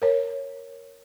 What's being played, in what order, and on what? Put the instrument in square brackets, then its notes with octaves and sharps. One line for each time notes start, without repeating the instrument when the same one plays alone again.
[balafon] A#4 C#5